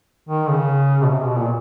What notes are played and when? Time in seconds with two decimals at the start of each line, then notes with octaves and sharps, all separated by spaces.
0.29 D#3
0.49 C#3
1.02 B2
1.09 C3
1.24 B2
1.39 A#2